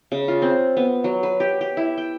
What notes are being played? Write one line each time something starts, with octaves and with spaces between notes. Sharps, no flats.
C#3
F4
C4
B3
F#3
B4
G4
G4
E4
G5